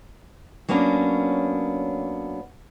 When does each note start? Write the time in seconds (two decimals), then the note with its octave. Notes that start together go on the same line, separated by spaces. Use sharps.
0.69 F#3 A#3 B3 C#4 D4